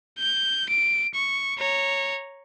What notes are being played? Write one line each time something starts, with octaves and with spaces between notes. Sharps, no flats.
G6
D7
C#6
C#5 A#5